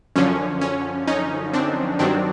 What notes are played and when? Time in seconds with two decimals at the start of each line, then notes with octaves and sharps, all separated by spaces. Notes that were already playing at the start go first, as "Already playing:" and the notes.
0.16 F#2 D3 F3 C#4
0.61 C#4
1.07 C#4 D#4
1.53 C4 D4
1.99 G2 D#3 F#3 C4 D4